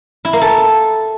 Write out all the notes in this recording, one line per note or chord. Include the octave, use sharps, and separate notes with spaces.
E4
A#3
A4